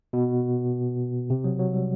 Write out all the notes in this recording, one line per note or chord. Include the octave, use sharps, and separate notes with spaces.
B2
C3
F#3
F#3
G3